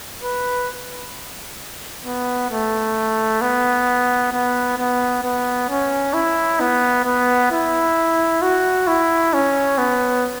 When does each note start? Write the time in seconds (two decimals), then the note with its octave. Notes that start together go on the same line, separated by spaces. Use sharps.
0.23 B4
2.05 B3
2.51 A3
3.42 B3
4.33 B3
4.78 B3
5.24 B3
5.69 C#4
6.14 E4
6.60 B3
7.05 B3
7.51 E4
8.42 F#4
8.88 E4
9.34 C#4
9.78 B3